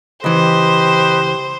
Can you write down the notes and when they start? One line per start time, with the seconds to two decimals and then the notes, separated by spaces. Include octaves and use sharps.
0.24 C#2 E3 G4 B4 C5 D#5